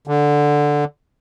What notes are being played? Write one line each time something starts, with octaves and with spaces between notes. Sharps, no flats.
D3